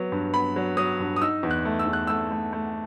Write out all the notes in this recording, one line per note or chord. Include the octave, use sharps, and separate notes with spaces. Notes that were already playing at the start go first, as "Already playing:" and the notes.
Already playing: F#3 B3
G2
B3 B5
F#3
F#3 D#6
G2
D#6
D#4 E6
E2
F#6
A3
E6
E2
F#6
A3 E6
A3
A3